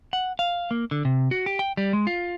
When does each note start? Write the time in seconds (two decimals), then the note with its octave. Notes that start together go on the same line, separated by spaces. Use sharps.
0.13 F#5
0.39 F5
0.71 A#3
0.91 D3
1.05 C3
1.31 F#4
1.46 G4
1.59 G5
1.77 G3
1.93 G#3
2.07 F4